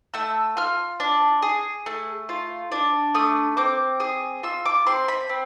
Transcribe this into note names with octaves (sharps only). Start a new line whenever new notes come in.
A3 E6
F4 F6
D4
G#4
A3
F4
D4
A3 D#6
C4 D6
G#4 D#6
F4 E6
D6
C4 C6
B5
C4